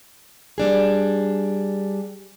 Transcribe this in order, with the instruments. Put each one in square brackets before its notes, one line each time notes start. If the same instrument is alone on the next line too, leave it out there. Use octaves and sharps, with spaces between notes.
[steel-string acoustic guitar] G3 D4 G#4